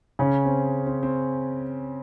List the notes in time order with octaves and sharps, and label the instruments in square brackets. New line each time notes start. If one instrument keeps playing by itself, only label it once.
[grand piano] C#3 C#4
C4
C4
C4